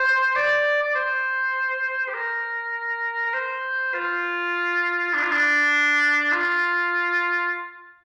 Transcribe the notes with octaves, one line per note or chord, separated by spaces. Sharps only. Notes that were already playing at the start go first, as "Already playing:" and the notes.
Already playing: C5
D5
D5
C5
G4
A#4
A#4
C5
F4
D4
F4
D4
F4